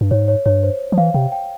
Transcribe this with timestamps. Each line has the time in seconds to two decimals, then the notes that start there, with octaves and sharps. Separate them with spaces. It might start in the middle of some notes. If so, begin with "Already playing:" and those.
0.01 G2
0.11 G#2 C#5
0.28 C#5
0.46 G2 C#5
0.63 C5
0.92 F3
0.98 E3 F5
1.14 C3 G5
1.32 G5